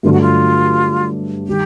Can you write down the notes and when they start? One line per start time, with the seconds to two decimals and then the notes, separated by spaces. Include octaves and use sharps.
0.03 G2 D3 F#3 A3 D4 F4
0.12 F#4
0.21 F4
1.47 D#3 G3 G4